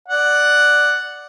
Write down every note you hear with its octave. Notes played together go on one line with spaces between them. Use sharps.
D5 F#5